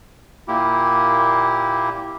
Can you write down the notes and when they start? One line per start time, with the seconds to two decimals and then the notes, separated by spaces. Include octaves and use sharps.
0.48 A#2 A#3 E4 G4